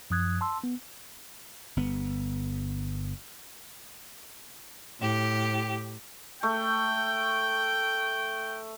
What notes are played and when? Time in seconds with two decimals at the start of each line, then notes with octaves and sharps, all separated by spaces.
0.10 F#2 F3 D#6 F#6 G#6
0.41 A5 C6 E6
0.64 B3
1.77 G1 B3
5.01 A2 G4
6.43 A3 G5